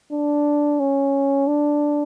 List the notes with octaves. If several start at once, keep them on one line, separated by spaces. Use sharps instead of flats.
D4
C#4
D4